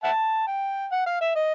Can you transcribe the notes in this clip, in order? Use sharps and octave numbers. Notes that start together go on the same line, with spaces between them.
E5 F#5 A5
G5
F#5
F5
E5
D#5